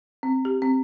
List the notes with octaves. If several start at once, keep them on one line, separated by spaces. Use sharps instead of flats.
C4
G4
C4